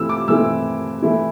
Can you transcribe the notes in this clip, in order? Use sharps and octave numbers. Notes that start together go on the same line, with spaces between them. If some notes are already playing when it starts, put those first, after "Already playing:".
Already playing: E3 A3 C4 E4 E6
D6
E3 A3 C4 E4 E6
E3 A3 E4